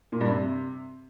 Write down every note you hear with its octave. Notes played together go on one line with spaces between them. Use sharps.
A#2
G2
C3